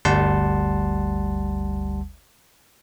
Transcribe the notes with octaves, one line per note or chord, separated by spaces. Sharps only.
G1 D2 G3 F#5 A5 C6